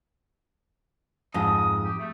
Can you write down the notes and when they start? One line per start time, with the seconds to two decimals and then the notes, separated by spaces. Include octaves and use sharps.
1.34 F2 G#2 D#6
1.83 G4
1.98 A3